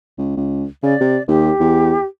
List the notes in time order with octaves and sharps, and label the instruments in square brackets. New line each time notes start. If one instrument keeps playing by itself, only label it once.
[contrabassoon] C#2
C#2
[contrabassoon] C#3 [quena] D5
[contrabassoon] C3
[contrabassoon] D#2 [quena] G4
[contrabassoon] E2